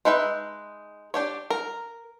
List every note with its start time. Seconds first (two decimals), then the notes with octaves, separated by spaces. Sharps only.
0.05 G#3 D#4 B4 E5
1.14 D4 G4 C#5
1.50 A#4